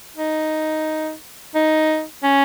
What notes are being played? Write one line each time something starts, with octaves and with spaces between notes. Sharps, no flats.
D#4
D#4
C#4